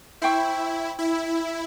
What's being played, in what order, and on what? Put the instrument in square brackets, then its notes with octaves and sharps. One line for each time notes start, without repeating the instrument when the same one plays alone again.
[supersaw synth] E4 [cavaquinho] C5 G5 C#6
[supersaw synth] E4